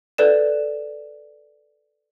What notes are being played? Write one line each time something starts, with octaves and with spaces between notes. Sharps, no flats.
A4 B4 D5 E7